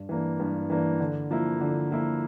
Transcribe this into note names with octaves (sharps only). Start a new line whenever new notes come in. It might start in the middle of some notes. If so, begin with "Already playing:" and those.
Already playing: G2
E3 A#3 D4
G2
E3 A#3 D4
D3
F3 A#3 E4
D3
F3 A#3 E4